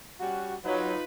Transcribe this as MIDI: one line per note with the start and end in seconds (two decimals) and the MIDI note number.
0.20 0.54 55
0.20 0.54 61
0.20 0.54 66
0.65 0.92 54
0.65 1.04 63
0.65 1.04 65
0.65 1.04 71